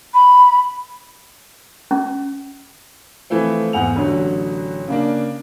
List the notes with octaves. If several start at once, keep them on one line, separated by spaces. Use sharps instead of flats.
B5
C#4
E3 F3 A3 C4
E2 G#2 F#5 G#5 F7
A1 D3 F#3
C#3 A#3 D4